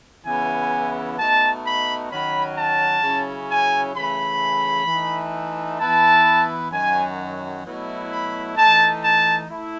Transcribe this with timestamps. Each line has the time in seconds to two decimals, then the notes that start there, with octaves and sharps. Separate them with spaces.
0.24 C#3 E3 B3 E4 G#5
1.17 B2 A3 D#4 A5
1.63 B5
2.10 D#3 F#3 C#4 B5
2.55 A5
3.02 C#3 F#3 C#4 E4
3.49 G#5
3.94 C#3 E3 A3 B5
4.87 E3 A3 D#4
5.79 E3 B3 E4 A5
6.71 F#2 D#3 F#3 G#5
7.64 B2 F#3 A3 E4
8.10 B5
8.56 E3 A3 D#4 A5
9.02 A5
9.49 A3 E4